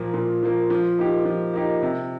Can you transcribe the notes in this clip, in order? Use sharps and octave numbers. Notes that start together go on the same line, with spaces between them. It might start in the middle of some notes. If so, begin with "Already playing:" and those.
Already playing: A#2 F3 A#3
A#2
F3 A#3
F3
A#3 D#4 G4
F3
A#3 D#4 G4
C3